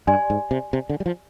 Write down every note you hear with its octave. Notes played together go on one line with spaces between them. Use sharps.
G2 G4 D5 G#5 C6
G#2
C3
C3
D3
G3
F3